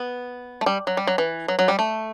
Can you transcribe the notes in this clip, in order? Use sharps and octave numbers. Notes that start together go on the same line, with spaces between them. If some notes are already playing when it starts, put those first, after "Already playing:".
Already playing: B3
A3
G3
F#3
G3
F#3
E3
F#3
F#3
G3
A3